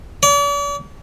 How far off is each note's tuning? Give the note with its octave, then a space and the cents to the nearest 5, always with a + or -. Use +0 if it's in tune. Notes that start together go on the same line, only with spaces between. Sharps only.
D5 -45